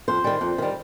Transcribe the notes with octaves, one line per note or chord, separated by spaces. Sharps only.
F2 C5
D#3 G3
F2
D#3 G3